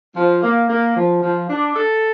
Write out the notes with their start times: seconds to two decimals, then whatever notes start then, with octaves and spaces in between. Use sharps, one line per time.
0.15 F3
0.43 A#3
0.68 A#3
0.95 F3
1.22 F3
1.49 D4
1.75 A4